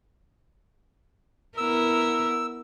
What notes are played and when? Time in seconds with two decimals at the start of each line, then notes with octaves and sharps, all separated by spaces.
1.57 B3 E4 A#4 E6